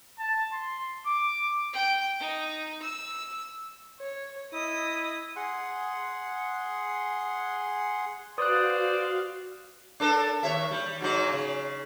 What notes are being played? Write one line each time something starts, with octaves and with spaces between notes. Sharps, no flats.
A5
C6
D6
G5
D#4
E6
C#5
E4 D#5 D#6
G#4 F#5 C6
F#4 B4 C5 D5 F5 D#6 F#6
D4 A4 A#4
D#2 C#5 E5
G3
G#2 F#3 D#4
C#3